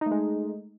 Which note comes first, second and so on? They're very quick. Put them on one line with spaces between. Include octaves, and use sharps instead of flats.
D#4 A3 G#3